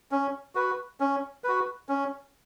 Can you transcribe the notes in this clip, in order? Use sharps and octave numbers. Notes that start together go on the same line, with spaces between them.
C#4
F#4 B4
C#4
F#4 B4
C#4